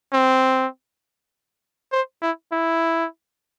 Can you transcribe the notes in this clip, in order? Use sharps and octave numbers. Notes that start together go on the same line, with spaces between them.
C4
C5
E4
E4